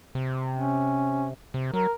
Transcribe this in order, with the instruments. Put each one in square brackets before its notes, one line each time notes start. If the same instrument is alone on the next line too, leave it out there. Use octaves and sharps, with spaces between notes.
[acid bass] C3
[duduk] C#4
[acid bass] C3
[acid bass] F#3 [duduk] A#4